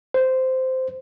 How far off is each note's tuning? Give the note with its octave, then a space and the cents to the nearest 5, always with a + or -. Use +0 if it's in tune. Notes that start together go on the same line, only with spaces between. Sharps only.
C5 -10